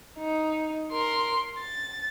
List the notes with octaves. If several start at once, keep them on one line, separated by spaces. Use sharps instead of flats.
D#4
A#4 C6
A6